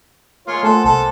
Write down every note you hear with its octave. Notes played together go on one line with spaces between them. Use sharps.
G#3 A#3 F4 C#5
A3 F4 A4 C5 F#5 G#5
C2 A4